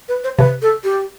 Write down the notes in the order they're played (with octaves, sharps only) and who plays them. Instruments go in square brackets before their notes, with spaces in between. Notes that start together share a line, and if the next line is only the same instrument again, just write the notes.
[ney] B4
C5
[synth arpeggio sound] C3 [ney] B4
[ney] A4
G4